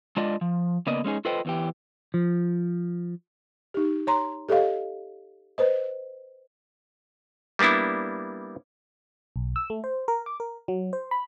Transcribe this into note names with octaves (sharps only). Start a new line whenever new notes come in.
G#3 D4 F4 D5 D#5
F3
C#3 A#3 B3 D5 D#5
G#3 C#4 D#4 G#4
F4 A4 B4 C5 D#5 G5
E2 E3 G4
F3
D#4 G4
C#5 A#5 C6
G4 A4 C#5 D#5 F5
B4 C5 D#5
G3 A#3 B3 D4 E4
B1
E6
A3
C5
A#4
D6
A#4
F#3
C5
B5